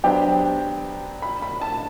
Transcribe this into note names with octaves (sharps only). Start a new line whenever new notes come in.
F#3 B3 D4 G4 C5 G5
B5
B5
A5